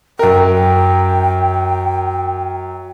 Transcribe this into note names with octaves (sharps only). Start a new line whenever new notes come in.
F#2 A#4 G5